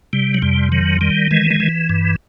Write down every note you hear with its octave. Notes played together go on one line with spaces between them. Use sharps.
C3 G3
F#3
F2 G3
D#3 F#3
D#3 G3
E3 G#3
G#3
E3
G2